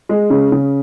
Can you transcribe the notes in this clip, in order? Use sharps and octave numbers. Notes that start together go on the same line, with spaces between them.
G#3
C#3
C#3